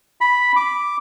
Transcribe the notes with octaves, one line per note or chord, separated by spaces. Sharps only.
B5
D6